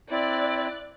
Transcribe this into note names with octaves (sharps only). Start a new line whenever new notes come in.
C4 E4 D5 F#6